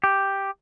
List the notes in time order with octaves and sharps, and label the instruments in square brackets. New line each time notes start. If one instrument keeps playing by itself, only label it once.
[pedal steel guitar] G4